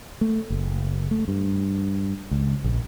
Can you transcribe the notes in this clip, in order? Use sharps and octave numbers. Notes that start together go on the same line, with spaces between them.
A3
F#1
A3
G2
C#2
A#1